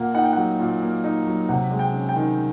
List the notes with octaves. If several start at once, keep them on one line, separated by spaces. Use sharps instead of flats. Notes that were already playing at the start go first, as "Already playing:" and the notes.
Already playing: A#2 A#3 F#5
D#4 F#5
G5
F#3 F#5
A#2
A#3
D#4
F#3
C3 F#5
G#3
G5
C#4
G5
D#3